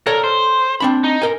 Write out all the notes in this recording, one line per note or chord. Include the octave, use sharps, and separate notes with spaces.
A4 A#4 C#5 D5
C5
C4 D4 B5
D#4
A#4 G#5